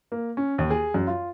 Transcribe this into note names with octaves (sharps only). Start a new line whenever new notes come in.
A#3
C#4
D#2
G#4
F#2
F4